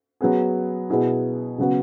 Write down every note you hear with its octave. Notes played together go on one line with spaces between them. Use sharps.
F#3 B3 G#4
B2 B3 E4 G#4
C#3 F#3 B3 F#4